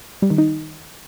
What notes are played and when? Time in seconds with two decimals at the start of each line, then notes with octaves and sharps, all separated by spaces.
0.22 G3
0.30 D#3
0.38 D#4